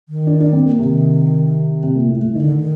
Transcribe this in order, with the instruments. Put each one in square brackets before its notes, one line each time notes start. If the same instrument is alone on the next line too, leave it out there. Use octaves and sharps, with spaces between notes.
[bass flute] D#3
[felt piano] D4
D4
C4
A#3
[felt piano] C3 [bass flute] D#3
[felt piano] C3
A#2
A2
A2
[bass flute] D3 [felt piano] D#3
[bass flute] D#3